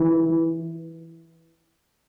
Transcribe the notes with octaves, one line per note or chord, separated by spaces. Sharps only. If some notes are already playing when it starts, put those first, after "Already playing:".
Already playing: E3